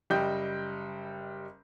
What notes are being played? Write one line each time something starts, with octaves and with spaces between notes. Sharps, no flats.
F#1 G3 D#5 G5 G6